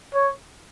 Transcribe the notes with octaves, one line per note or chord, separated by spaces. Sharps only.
C#5